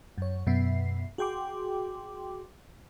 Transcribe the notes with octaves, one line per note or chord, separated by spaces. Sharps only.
F#2 C#5
F#2 B2 B3 E5 C7
F#4 G#4 G5 C6 D6